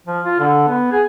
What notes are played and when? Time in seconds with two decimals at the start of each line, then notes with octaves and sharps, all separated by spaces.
0.07 F3
0.25 F4
0.39 D3
0.68 B3
0.92 G#4